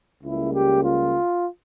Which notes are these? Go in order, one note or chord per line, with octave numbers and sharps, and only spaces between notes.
C#2 C#3 G3 A#3 E4
G4
F4